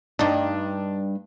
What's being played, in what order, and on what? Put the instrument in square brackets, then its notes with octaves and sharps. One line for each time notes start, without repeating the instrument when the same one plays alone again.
[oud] G2 D#4 [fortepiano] D4